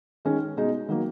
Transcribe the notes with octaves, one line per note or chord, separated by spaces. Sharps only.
D#3 G#3 C#4
B2 G#3 D#4
D#3 F#3 A#3